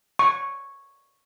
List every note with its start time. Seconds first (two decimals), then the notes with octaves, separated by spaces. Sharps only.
0.19 C#6